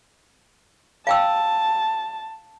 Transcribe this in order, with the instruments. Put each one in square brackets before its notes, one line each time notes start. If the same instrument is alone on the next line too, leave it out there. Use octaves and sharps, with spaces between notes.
[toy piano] F5 G5 E6 [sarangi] A5